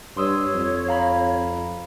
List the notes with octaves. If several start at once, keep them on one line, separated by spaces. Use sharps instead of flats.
G2 C#5 C6 D#6 E6
F2
F5 A#5 B5